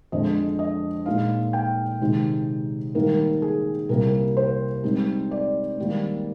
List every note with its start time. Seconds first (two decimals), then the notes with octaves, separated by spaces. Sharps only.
0.12 F2 D3 G#3 D#5
0.59 D#5
1.06 A#2 G#3 D#4 F5
1.53 G5
2.01 C3 D#3 G#3 D#4
2.95 G#2 D#3 G3 A#3 D#4 A#4
3.42 G#4
3.89 C2 C3 G3 A#3 A#4
4.37 C5
4.84 G#2 G3 C4 D#4
5.31 D5
5.78 G#2 D#3 G3 A#3